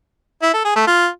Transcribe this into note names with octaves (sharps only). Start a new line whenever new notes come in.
E4
A4
G#4
A3
F4